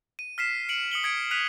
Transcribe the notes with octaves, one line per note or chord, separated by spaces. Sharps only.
D#7
F6 B6 C7 E7
C#7 D7 F#7
D#6 C#7 F#7 G7
D#6 G#6 B6 C#7 D7
F#6 B6 D#7 F7